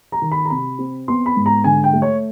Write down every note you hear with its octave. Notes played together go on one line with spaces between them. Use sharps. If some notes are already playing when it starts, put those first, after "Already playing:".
A#5
D#3
B5
A#5
C3 B5
C4
B3 C6
B5
G#2
A#5
D3 G#5
G5
A3
C#5